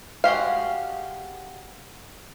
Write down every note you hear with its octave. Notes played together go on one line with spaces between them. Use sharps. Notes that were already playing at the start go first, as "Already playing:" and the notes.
G#3 F#4 G4 F5